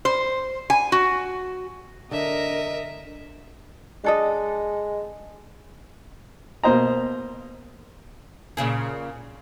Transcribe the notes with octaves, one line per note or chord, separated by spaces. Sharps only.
C5
G#5
F#4
D3 A#4 D#5 E5
G#3 D4 A4 D#5
B2 A#3 C5 D#5 A#5
A#2 C#3 G#4